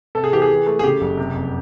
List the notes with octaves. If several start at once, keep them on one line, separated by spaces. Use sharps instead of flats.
C3 A4
G#4
E3 G4
G#4
E3
A3
G#4
C#3 G4
F#1
C3
F1